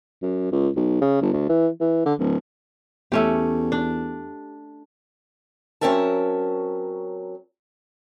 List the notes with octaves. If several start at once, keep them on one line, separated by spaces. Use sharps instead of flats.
F#2
C#2
B1
C#3
G1
D2
E3
E3
D3
D1
E2 A3 C#4 G4
D4
F#3 C4 C#4 A#4 E5 A5